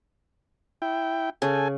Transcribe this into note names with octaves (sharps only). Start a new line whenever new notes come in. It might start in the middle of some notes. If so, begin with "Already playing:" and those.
E4 G5
C#3 A4 G#5